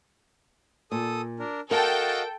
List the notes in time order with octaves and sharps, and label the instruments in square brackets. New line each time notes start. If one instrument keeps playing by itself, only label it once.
[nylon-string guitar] A#2 [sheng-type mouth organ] A4 D#6
[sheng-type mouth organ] D4 A#4
[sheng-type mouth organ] F#4 D#5 F5 [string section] A4 G5 [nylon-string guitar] A#4